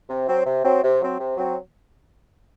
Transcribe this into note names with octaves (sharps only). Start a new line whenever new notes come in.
C3
F#3 C4
C3
F#3 C4
C3
F#3 C4
C3
F#3 C4